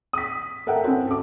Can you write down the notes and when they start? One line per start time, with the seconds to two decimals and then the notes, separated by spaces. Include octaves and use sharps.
0.13 D#6 B6
0.67 A4 A#4 E5 F#5 G5
0.84 C4 C#4 E4 F#4 A4
1.07 A4 D6